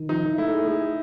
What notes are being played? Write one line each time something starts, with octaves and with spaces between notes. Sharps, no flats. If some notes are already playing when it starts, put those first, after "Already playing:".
Already playing: D#3
F3 D#4
E4
A3 E4
G#4